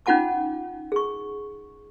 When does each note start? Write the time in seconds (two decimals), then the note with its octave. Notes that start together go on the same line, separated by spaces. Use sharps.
0.06 C#4 D#4 F4 F#5 A5 D6
0.92 G#4 C#6